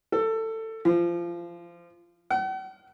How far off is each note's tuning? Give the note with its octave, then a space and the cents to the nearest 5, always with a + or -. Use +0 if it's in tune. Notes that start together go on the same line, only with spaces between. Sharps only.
A4 +20
F3 -25
F#5 +45